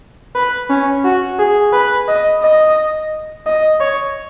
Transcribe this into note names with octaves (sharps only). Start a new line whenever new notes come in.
B4
C#4
F#4
G#4
B4
D#5
D#5
D#5
C#5